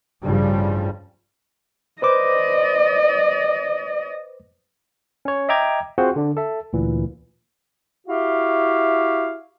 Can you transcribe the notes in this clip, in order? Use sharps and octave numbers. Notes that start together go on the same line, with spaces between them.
A1 G2 C#3 F3 G3
B4 C5 D5 D#5 D6
C#4 C#5
D#5 E5 G5 A#5 D6 G#6
C4 F4 F#4 G#4 C5 F#5
D3 D4
A4 E5
D2 A#2 E3
E4 F#4 G4 E5 F5